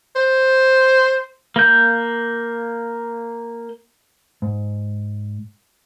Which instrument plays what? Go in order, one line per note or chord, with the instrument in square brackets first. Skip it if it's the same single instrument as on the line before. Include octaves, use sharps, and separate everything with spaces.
[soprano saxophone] C5
[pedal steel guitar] A#3 G6
[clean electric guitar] G#2